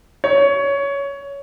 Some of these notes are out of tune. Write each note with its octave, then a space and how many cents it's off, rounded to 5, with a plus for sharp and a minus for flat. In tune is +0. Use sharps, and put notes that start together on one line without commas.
C#5 +15